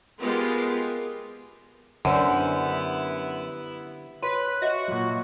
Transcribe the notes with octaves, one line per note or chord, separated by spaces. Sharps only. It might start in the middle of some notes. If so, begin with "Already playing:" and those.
G#3 B3 F4 G4 G#4 A#4
F#2 D3 G3 B3 E4 C5 E5
B4 C#5 B5 C6
F#4 D#5 E5
A#2 F#3